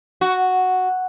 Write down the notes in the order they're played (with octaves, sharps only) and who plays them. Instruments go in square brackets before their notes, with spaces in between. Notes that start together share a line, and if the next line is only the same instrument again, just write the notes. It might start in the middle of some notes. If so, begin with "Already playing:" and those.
[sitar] F#4